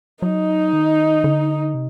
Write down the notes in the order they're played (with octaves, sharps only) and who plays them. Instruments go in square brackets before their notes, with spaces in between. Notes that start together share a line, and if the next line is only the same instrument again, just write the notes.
[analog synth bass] F#3 [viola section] D#4
[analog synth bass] D#3
D3
C3